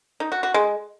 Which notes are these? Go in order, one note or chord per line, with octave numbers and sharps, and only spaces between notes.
D#4
F#4
F#4
G#3